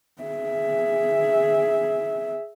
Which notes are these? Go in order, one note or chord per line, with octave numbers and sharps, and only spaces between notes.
G#4 E5